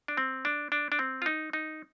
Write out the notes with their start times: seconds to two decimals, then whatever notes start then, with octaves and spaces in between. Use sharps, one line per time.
0.08 D4
0.17 C4
0.45 D4
0.72 D4
0.92 D4
0.99 C4
1.22 F4
1.26 D#4
1.53 D#4